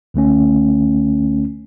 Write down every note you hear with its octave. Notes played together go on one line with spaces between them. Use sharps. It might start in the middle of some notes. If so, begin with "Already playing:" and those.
C#2 D3 A3 C#4